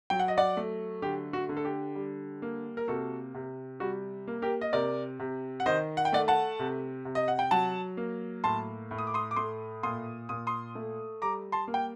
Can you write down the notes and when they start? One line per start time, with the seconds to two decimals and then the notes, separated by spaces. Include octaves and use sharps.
0.10 F#3 G5
0.19 F#5
0.28 D#5
0.38 D5 F#5
0.57 A3
1.02 D3 G4
1.33 F#4
1.49 D3
1.57 A4
1.65 G4
1.95 G3
2.42 A#3
2.77 A#4
2.88 C3 F#4 A4
3.34 C3
3.80 G3 F#4
4.27 A#3
4.42 G4 A#4
4.61 D#5
4.73 C3 A#4 D5
5.19 C3
5.60 F#5
5.66 D#3 C5 D#5
5.97 F#5
6.05 G5
6.12 A3 D5 F#5
6.28 F#5 A5
6.59 C3
7.05 C3
7.15 D#5
7.28 F#5
7.39 G5
7.51 F#3 F#5 A5
7.97 A#3
8.44 A2 A5 C6
8.91 A2
8.98 D#6
9.07 D6
9.14 C6 D#6
9.31 D6
9.36 A3 C6 D#6
9.83 A#2 C6 D#6
10.29 A#2 D#6
10.47 C6 D#6
10.75 A3
11.22 G3 A#5 D6
11.52 A5 C6
11.68 A#3
11.74 G5